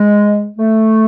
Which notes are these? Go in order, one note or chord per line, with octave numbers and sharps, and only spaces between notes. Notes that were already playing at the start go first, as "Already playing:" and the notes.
Already playing: G#3
A3